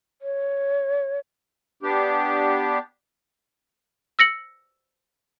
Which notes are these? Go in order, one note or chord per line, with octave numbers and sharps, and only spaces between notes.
C#5
B3 D4 G4
E6 A#6 C#7 F#7